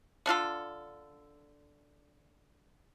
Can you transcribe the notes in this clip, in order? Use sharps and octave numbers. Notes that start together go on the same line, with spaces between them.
D3 D4 F4 A4